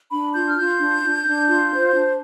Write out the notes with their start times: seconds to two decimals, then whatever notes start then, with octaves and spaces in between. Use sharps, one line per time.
0.10 D4 B5
0.33 F4 G6
0.48 F6
0.58 F4 G6
0.79 D4
1.03 D4
1.26 D4
1.48 F4
1.72 C5
1.94 D4